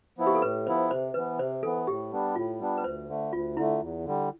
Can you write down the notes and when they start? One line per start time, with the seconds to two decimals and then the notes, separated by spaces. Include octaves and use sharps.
0.18 F3 B3 E4
0.27 G4
0.35 A4
0.42 A2 B4
0.67 F3 B3 E4 C5
0.90 C3 C5
1.14 E3 B3 B4
1.38 C3 C5
1.63 E3 B3 A4
1.87 A2 G4
2.12 G3 B3 D4
2.36 A2 F4
2.60 G3 B3 D4
2.77 B4
2.84 D2 C5
3.08 D3 A3
3.32 D2 F4
3.57 D3 A3 E4
3.81 E2
4.05 D3 G3